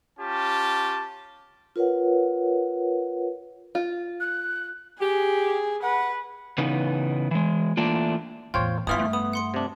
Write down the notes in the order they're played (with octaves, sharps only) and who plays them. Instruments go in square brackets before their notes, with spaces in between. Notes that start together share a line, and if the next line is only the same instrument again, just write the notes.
[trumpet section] C#4 F4 G4 A5
[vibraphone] F4 A#4 B4 C#5 F#5
[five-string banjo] F4
[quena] F#6
[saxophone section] G4 [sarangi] G#4
[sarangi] B4 [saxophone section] F#5
[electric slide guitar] C#3 E3 B3 D#4
E3 G#3
E3 A3 A#3 D4 F4
[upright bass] E2 A2 [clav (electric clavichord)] F4 C5 C#5 [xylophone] G5
[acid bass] D1 [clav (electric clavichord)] G1 E3 F4 [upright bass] G2 [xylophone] D#6 F6 B6
[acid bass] A3
[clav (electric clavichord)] B3 [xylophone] D#6
[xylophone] F#5 C6 C#7
[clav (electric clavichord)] C3 D4